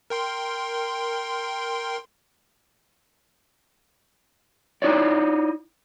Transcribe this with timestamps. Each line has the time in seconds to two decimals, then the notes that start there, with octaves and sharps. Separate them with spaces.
0.10 A#4 G5 C6
4.82 D#4 E4 C#5 D5